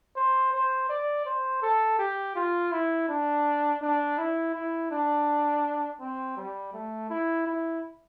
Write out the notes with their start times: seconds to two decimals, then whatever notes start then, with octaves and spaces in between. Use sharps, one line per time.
0.16 C5
0.52 C5
0.89 D5
1.26 C5
1.62 A4
1.99 G4
2.36 F4
2.72 E4
3.08 D4
3.81 D4
4.18 E4
4.54 E4
4.91 D4
6.00 C4
6.37 G3
6.73 A3
7.10 E4
7.46 E4